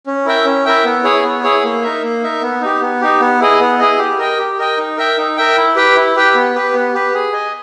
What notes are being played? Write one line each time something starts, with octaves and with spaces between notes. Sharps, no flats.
C#4
E4 A#4 E5 G5
C#4
E4 A#4 E5 G5
B3
E4 G#4 C#5
B3
E4 G#4 C#5
A#3
D#4 A#4 E5
A#3
D#4 A#4 E5
B3
D#4 G4
B3
D#4 G4
B3
E4 G#4 D#5
B3
E4 G#4 D#5
G4
A#4 D#5 G5
G4
A#4 D#5 G5
D#4
A#4 E5 G5
D#4
A#4 E5 G5
E4
G4 B4 G5
E4
G4 B4 G5
B3
G4 B4
B3
G4 B4
G#4
D#5 G#5